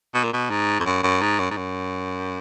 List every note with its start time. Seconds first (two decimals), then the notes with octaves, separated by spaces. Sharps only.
0.14 B2
0.24 A#2
0.33 B2
0.50 G#2
0.79 F2
0.86 F#2
1.03 F#2
1.21 G#2
1.39 F#2
1.51 G#2
1.57 F#2